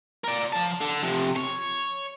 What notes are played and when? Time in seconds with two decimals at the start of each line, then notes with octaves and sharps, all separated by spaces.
0.24 A#4 D5
0.53 F3 A5
0.81 D3
1.03 C3 F3
1.36 C#5